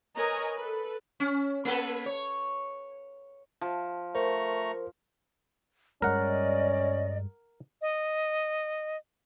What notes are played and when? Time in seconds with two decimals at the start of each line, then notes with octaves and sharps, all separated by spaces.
0.15 A#4 B4 C#5 D#5 G#5 A#5
0.56 A4 B4
1.20 C#4
1.65 A#3 A4 B4
2.06 C#5
3.61 F3
4.15 A3 A#4 C5 A#5 C#6
6.02 G2 G3 G#3 C#4 A#4 D5 D#5 F#5
7.81 D#5